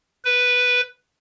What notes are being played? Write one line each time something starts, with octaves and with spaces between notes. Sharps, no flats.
B4